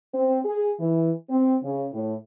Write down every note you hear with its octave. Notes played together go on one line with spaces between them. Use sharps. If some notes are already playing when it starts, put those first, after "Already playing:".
C4
G#4
E3
C4
C#3
A2